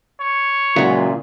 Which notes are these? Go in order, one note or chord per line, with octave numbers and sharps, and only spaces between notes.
C#5
A#2 C#3 F#3 G#3 E4 F4